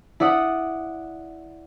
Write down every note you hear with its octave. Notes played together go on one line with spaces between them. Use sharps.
E4 D5 F#5 D#6